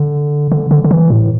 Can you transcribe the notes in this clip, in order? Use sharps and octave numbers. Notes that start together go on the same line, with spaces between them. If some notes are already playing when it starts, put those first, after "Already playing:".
Already playing: D3
D3
D3
D3
E3
A2